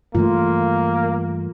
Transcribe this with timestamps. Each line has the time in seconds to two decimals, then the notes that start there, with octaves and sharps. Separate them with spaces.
0.15 G2 E3 A3 A#3 F4